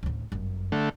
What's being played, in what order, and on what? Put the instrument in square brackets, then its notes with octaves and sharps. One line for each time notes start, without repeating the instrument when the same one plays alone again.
[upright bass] A1 D2
G1 F#2
[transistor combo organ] D3 A3